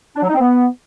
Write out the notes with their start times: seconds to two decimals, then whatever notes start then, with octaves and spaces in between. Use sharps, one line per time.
0.16 D4
0.22 F#3
0.28 D#4
0.34 C4
0.41 B3